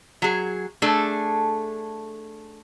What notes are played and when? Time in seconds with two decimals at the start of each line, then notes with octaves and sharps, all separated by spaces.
0.22 F#3 G#4
0.82 A3 D4 G#4 A4